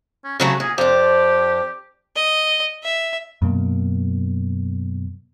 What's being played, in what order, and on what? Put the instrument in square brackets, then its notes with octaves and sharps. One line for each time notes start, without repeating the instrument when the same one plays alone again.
[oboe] C#4
[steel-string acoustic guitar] C#3 F#3 A3 [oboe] F#4
[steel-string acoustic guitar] A#2 [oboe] G#4
[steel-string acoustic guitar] F2 D4 [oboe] G4 [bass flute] C5
[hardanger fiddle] D#5
E5
[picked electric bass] F#2 B2 A#3